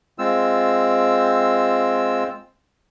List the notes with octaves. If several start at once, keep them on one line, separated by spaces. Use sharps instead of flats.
G#3 C4 F4 E6